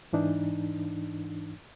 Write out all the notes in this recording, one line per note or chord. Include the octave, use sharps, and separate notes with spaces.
G#2 E3 D4 D#4